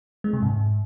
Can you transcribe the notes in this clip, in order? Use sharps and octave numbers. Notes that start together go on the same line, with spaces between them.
G#3
C3
G#2